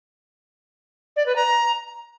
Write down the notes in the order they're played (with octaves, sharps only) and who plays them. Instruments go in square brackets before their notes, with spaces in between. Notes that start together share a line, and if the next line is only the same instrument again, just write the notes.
[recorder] D5
B4
A#5